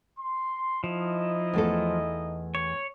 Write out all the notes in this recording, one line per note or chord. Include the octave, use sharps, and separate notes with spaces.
C6
F3 D#4 E4 D#5
E2 A3 A4
C#5